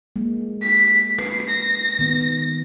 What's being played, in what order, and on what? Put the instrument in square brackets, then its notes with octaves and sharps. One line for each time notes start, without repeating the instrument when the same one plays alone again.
[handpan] G#3 A#3
[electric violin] B6
[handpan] B4 [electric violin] C7
[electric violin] A#6
[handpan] D#3 B3